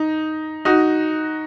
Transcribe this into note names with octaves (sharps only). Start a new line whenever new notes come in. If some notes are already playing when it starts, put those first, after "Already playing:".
Already playing: D#4
D#4 F#4